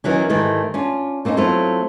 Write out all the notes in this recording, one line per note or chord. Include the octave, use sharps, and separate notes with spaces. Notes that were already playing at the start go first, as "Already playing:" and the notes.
D#3 E3 F#3 C#4
G#2 D#3 E3 G3 A3
C#4 D4 F4
A3 A#3 C4 C#4 D#4
F#3 A3 C4 E4 F4